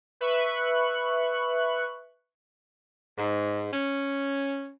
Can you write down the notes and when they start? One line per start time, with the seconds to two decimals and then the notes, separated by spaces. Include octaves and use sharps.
0.21 B4 E5 C#6 F#6
3.18 G#2
3.72 C#4